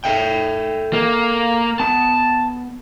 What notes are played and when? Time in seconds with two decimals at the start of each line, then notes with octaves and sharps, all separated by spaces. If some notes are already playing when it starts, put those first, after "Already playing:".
0.04 A4 E5 G5
0.93 A#3
1.80 B3 A5